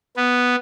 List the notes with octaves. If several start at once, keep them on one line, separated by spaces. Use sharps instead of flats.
B3